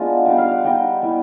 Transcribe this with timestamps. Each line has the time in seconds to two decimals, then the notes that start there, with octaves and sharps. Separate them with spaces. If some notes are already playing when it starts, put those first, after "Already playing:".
Already playing: G#3 B3 D4 F4
0.26 G3 B3 D#4 F5
0.38 F5
0.51 F#5
0.64 G3 B3 D#4 G5
1.02 G3 B3 E4